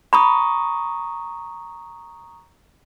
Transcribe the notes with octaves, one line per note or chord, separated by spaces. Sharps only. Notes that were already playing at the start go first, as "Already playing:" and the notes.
A#5 B5 C#6 D#6